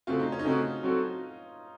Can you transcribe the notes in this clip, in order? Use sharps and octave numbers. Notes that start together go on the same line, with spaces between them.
C#3 A3 C4 F4 F#4
D#4
C#4
D#4
C#3 A3 C4 C#4 F#4
F#3 C4 F#4 A4